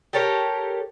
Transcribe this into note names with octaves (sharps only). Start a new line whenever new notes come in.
G4 A4 A#4 C#5